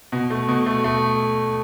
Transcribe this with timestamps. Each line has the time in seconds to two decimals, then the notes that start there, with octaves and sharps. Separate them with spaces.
0.12 B2
0.30 A3
0.48 B2
0.66 A3
0.84 A3